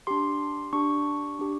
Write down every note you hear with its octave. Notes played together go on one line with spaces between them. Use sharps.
D4 G4 C6
D4 G4 C#6
D4 G4